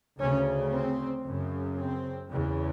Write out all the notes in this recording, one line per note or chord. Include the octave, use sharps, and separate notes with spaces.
D2 C#3 C#4
C4
F#2 C#3
C4
E2 C#3